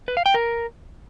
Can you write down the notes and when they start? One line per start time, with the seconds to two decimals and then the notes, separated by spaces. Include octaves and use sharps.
0.08 B4
0.17 F5
0.26 G5
0.34 A#4